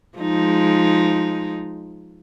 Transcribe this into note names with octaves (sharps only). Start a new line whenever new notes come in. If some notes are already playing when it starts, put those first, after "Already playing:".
F3 G#3 D#4